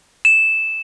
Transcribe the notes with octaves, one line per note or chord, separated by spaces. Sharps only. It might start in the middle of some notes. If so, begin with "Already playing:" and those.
E7